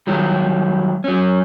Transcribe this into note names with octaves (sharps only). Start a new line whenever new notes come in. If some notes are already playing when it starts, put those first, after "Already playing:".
D#3 F#3 G3
F#3 C#4